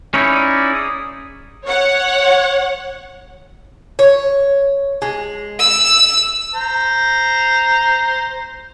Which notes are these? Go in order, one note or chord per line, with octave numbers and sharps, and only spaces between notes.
C#4 D#4 E4
D5
G#4
C#5 F#5
C#5
G#3
E6
C5 A#5